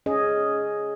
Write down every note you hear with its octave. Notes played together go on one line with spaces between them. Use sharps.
C#4 G#4 D#5